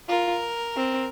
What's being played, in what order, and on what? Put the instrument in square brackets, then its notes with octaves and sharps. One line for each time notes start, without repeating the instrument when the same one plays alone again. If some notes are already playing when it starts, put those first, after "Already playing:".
[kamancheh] F4 [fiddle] A#4
[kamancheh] C4